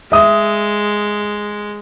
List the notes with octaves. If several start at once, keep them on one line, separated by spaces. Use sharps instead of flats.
G#3 E5 D#6